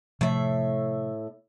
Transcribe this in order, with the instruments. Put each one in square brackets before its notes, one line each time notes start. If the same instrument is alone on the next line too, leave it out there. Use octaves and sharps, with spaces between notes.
[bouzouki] A2 E5 [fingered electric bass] C3 F3 A3